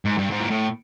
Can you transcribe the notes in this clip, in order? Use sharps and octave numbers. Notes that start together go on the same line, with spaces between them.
G#2
G2
G#2
A#2
A2